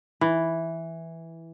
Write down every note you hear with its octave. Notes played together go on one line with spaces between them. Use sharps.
E3